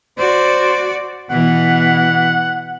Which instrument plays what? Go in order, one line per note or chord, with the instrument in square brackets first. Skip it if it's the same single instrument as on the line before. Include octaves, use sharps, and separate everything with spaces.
[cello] F#4 D5 [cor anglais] C5
[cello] B2 E3 [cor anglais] F#5